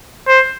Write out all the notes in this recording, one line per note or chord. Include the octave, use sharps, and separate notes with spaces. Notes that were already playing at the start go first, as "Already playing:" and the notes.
C5